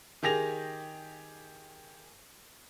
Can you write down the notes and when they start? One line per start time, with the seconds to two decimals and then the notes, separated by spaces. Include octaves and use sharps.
0.23 D#3 G4 G#4 A#6 F7